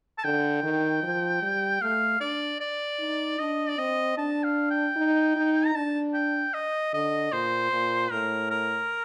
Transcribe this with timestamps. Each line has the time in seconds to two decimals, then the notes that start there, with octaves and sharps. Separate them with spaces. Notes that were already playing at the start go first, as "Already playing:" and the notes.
0.18 A5
0.24 D3 G5
0.64 D#3
1.03 F3
1.42 G3
1.82 A3 F5
2.21 D4 D5
2.60 D5
3.00 D#4
3.39 D4 D#5
3.69 D5
3.78 C4 D#5
4.18 D4 A5
4.44 F5
4.71 G5
4.96 D#4
5.36 D#4
5.65 A#5
5.75 D4 A5
6.14 G5
6.54 D#5
6.93 D3 D#5
7.32 A#2 C5
7.72 A#2
8.12 A2 A#4
8.51 A#4